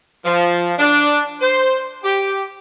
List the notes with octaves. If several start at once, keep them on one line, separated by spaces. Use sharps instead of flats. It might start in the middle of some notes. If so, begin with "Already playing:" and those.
F3
D4
C5
G4